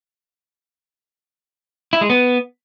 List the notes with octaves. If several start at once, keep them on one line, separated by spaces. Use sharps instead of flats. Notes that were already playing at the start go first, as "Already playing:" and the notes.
E4
G#3
B3